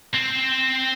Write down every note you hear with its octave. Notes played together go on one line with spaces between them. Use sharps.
C4